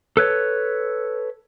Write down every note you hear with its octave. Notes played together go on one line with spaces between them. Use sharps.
A4 B4 C#5